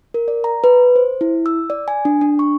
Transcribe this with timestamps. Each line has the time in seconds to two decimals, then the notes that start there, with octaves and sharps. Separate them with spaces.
0.14 A#4
0.28 D5
0.44 A#5
0.64 B4
0.96 C5
1.21 E4
1.46 E6
1.70 D5
1.88 G#5
2.05 D4
2.21 D4
2.39 C#6